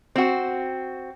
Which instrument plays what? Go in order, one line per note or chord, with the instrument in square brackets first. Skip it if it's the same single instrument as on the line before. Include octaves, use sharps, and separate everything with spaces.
[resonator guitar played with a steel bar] C4 F#4